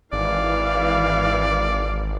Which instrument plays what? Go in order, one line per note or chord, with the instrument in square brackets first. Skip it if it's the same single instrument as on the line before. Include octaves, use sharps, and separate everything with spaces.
[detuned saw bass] G#1 [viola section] E3 F5 [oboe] D5